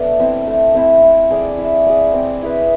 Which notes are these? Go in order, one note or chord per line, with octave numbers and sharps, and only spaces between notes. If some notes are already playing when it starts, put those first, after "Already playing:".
Already playing: A3 B3 D4 D5
C4 E4
A3
C4 E4
E4
G#4 D5
E4
G#4 D5
C4
E4 G#4 B4